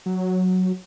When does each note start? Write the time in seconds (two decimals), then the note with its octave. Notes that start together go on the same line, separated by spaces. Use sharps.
0.06 F#3